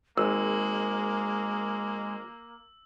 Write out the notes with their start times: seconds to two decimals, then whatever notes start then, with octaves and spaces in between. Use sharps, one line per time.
0.17 G#1 G#3 A#3 E6